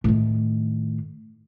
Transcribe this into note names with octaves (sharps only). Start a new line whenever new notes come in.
A2 D#3